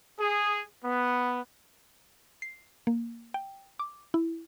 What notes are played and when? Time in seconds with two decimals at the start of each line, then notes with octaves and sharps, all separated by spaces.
0.19 G#4
0.85 B3
2.42 C7
2.87 A#3
3.34 G5
3.79 D6
4.14 E4